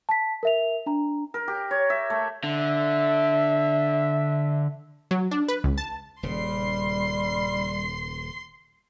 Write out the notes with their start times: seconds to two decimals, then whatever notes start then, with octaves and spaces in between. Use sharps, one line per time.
0.09 A5 B6
0.43 A#4 E5 F7
0.86 D4 A#5
1.34 A#4
1.48 G4
1.71 C#5
1.90 E5
2.10 A3
2.44 D3 E5
5.11 F#3
5.31 D4
5.48 B4
5.64 C#2
5.78 A5
6.23 D#1 C#3 G3 C6 C7